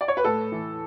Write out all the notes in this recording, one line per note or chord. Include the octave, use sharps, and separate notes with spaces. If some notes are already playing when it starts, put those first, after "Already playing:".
D5
C#5
B4
A2 A4
E3